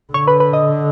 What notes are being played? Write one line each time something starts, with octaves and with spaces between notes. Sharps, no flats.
D3 C#5
B4
B4
D#5